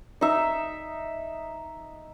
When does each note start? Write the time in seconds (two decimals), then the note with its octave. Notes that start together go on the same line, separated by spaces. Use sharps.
0.21 D#4 E5